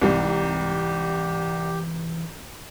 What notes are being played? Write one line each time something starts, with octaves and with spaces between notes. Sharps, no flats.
C2 G#2 C3 E3 G3 G4